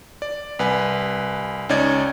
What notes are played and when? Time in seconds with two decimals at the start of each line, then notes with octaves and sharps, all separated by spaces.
0.22 D5
0.59 C2 B4 G#5
1.69 C#2 C#4 D#4 D5 G#6